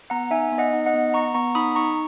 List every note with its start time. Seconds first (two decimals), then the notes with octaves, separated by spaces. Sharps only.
0.10 B3 F#5 A#5
0.31 D#4 E5 G#5
0.52 B3
0.58 D#5 F#5
0.73 D#4
0.86 D#5 F#5
0.94 B3
1.14 B3 A#5 C#6
1.35 B3 A#5 C#6
1.55 D#4 B5 D#6
1.75 D#4 A#5 C#6